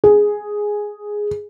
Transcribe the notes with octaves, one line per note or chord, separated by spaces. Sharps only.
G#4